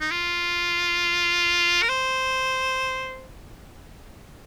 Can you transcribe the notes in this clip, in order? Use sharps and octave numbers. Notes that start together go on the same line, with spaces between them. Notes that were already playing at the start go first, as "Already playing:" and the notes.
D#4
F4
A#4
C5